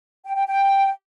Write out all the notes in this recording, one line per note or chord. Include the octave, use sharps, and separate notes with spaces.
G5
G5
G5